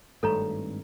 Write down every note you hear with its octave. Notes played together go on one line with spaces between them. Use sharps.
G#1 G2 A3 A4 C#5 A#5